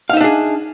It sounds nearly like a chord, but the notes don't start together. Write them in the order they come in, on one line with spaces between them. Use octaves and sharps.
F5 D#4 E5 D4 G#4